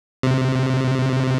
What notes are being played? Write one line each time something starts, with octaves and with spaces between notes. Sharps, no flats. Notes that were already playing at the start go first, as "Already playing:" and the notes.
C3